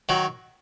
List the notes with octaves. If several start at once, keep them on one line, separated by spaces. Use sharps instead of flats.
D#3 F#3